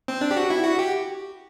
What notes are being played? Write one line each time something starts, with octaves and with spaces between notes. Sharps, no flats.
C4
D4
G4
F#4
E4
F#4
G4